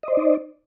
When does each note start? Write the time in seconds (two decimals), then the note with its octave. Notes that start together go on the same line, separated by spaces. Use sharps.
0.03 D#5
0.08 C5
0.12 D5
0.17 D#4